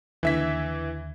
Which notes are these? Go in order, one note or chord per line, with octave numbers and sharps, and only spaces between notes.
D#2 D3 E3 E5 G#6 B6